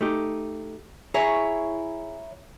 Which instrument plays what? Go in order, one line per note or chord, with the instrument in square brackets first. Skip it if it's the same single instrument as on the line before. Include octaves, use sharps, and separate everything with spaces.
[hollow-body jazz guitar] A3 D#4 G4
[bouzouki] E4 C#5 A#5 [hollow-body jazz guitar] G#4